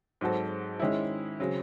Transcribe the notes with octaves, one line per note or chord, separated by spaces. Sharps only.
G#2 F#3 C4 F#4 A4
D#3 G#3 C#4 E4
C#3 F#3 C4